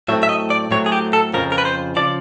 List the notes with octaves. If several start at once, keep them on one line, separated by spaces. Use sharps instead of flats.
A2 F#3 A3 C4 E5
E5
D#5
D5
A2 F#3 A3 C4 C#5
G#4
G4
A4
F2 C#3 F3 A#4
A#4
B4
C5
C#3 F3 D5